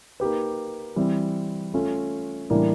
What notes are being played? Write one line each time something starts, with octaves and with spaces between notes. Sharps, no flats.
A#3 D#4 G4 B4
E3 G3 C4
A3 C#4 F4
A2 E3 G3 A#3 D4